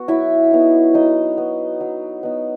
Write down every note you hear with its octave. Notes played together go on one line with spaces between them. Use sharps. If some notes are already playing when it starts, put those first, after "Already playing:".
Already playing: B3 F#4
F#3 E4 E5
B3 D#4
F#3 D#4 D#5
B3 D#4
F#3
B3 D#4